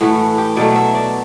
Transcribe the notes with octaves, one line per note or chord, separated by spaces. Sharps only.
A2 E3 A3 F#4
G4
B2 F#3 A3 D5
E5
D5